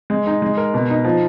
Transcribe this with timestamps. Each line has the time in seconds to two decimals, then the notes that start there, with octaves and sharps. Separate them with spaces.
0.10 G#3
0.27 D#4
0.42 G#3
0.57 A#4
0.74 B2
0.90 D#4
1.05 F3